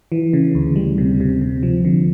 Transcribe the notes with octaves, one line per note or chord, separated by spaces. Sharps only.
E3
C#3
D2
G3
C3
C3
C3
F3
D3